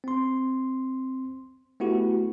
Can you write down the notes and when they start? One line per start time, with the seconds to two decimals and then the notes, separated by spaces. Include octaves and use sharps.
0.04 C4 C6
1.80 A3 B3 E4 F#4 G4